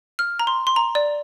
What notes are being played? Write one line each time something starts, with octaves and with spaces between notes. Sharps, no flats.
F6
A#5
C6
C6
A#5
D5